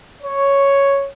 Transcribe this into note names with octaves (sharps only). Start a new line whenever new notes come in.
C#5